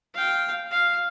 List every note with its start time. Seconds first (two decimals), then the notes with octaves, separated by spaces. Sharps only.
0.14 F5 G5
0.71 F5